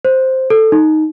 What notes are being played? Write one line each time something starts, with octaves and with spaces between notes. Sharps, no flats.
C5
A4
D#4